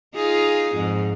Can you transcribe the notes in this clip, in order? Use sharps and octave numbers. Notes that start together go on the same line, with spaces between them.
D#4 F4 G#4
F2 G#2